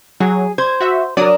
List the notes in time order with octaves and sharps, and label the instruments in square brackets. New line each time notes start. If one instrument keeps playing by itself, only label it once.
[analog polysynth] F#3 [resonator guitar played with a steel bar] G#4
[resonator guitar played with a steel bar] C5 [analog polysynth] G#6
[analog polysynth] F#4 E5
[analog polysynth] F#3 D5 D#6 [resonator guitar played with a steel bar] D4 A#4